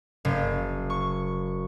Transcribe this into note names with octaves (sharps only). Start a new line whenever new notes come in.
F#1
C#6